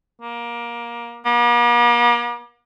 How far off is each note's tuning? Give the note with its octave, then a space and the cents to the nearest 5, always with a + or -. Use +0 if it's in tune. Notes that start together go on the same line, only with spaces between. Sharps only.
A#3 +20
A#3 +45